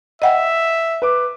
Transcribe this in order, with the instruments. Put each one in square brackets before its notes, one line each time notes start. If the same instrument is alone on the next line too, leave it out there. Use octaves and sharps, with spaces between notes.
[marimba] D#5 F#5 G5 [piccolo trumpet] E5
[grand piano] B4 D6